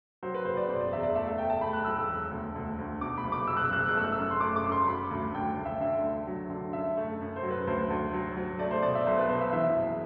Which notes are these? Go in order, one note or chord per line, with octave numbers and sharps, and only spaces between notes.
F#3 C5
B4
F#1 C5
D5
B2 C5
D5
E2 E5
D5
A3 E5
E5
A3 G5
A5
A3 B5
F#6
B1 E6
E6
E1
D2
D2
D2
B2 D6
B5
F#1
D6
B2 E6
F#6
E6
F#1 F#6
E6
F#6
A3 E6
F#6
E6
F#2
C6
A3 D6
D6
F#2
C6
F#3 B5
D2
D2 G5
D2
E5
D3 E5
D2
F#3
D3
F#2 E5
A3
F#2
C5
F#3
B4
D2 C5
D2
F#3
F#3
A3 D5
C5
B2 D5
E5
B1 C5
B4
B2 C5
E5
E3 E5
F#1